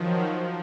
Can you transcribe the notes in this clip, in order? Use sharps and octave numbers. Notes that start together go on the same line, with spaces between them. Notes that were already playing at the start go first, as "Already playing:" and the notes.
Already playing: D#3 F3 F#3
F3